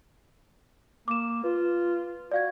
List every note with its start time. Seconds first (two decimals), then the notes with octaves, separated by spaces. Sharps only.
1.08 A#3 D6 E7
1.44 F4 B4
2.31 F#4 D5 F5 G#6